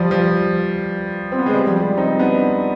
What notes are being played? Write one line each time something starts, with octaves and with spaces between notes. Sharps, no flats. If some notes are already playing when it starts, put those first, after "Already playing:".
Already playing: F3 G3
F3
C4
B3
G#3
G3
F3
G3
C4 D#4
B3 D4